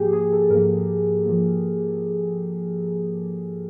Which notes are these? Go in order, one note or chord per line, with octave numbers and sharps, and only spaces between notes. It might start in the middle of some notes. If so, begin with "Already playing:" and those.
Already playing: G#2 F3 A#3 G4 G#4
G#4
A4
G#2 F3 A#3 A#4
G#2 F3 A#3